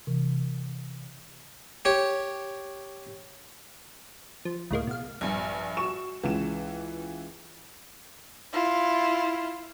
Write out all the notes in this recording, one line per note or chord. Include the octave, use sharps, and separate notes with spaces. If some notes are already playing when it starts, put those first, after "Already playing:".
C3 E3
G4 C#5
F3
C#2 A2 G#3 A#3
B2 F5
A#1 G2
F#4 C#6 E7
C#2 E3 E7
E4 F4